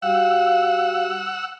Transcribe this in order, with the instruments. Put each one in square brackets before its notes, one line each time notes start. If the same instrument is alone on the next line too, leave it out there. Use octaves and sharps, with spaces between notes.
[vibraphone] G3 F#4 G4 [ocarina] F5 [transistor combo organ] F#5 E6